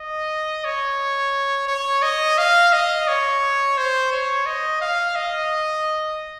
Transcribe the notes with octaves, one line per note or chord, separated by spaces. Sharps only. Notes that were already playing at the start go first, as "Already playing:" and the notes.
Already playing: D#5
C#5
C#5
D#5
F5
D#5
C#5
C5
C#5
D#5
F5
D#5